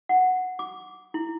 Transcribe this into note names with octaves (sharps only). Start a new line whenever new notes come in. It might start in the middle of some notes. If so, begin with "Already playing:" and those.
F#5
D6
E4